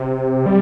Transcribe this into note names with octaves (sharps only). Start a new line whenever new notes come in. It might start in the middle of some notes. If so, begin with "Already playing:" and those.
Already playing: C3
G3